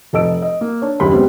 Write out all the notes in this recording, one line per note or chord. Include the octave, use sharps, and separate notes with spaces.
F1 A4 D#5 E6 D7
D#5
A#3
D4 C#5
F#1 D#2 B5 C6
G3 G#3 B3 C4